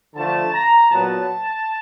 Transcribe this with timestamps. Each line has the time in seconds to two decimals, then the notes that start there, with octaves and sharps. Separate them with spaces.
0.15 D3 F3 A3 A5
0.53 A#5
0.91 A#2 F#3 B3 A5